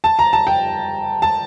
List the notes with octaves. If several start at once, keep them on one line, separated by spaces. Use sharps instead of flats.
A5
A#5
A5
G5
A5